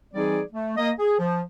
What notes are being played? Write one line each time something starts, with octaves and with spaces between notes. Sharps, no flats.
E3 G3 C4 D#4 G#4 D5
A3
A#3 D#5
G#4
F3